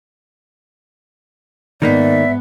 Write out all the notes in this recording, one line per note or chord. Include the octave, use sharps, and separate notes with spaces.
G#2 D#3 A#3 B3 D#4 D5 E5